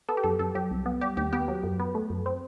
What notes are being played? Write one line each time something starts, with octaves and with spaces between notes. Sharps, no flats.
B3 A4
G4
F#2 A4
F#2 A4
F#3 G4
C2
B3
G3 G4
D#2 G4
B3 G4
F#3
F#2
B3
A3
F#2
C4